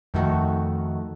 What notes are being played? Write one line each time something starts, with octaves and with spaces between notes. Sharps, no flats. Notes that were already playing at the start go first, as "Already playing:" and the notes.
F2 D#3 A3 D#4 F#4 A4